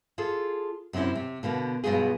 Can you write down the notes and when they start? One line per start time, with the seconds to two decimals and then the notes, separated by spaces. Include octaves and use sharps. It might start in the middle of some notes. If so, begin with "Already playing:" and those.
0.18 F4 G#4 A4
0.93 F#2 C3 C4 C#4 E4
1.15 C3
1.43 B2 D3 A#3 B3
1.84 G2 B2 F#3 B3 F4 G#4